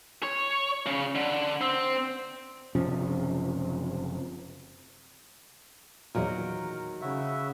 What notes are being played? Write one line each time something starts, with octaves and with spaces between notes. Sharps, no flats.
C#5
C#3
D3
C4
F#1 C3 F3 C#4
E2 A#2 D#3 F#3 A#4
C#3 E4 F#4 E5